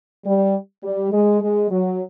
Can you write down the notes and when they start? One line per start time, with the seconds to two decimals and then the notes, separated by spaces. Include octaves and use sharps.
0.25 G3
0.83 G3
1.12 G#3
1.41 G#3
1.70 F#3